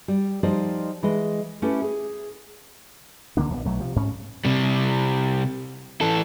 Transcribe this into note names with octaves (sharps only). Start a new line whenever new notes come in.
G3
F3 G3 D#4 C5 D5 D#5
E3 G#3 G#4 D#5
A3 C#4 E4 G4 A4 B4
G#4
C#2 D3 A#3 D4
A#1 F3 B3
B1 F#3 A3
C3 F3
G#2 C#4
C3 G3
E3 A4